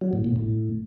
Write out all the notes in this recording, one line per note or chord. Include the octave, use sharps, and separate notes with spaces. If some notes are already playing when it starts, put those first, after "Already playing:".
F#3
A2
A#2
A2